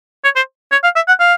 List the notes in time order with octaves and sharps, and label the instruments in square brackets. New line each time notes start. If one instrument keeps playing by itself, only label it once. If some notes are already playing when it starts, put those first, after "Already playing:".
[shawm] C#5
C5
C#5
F5
E5
F#5
F5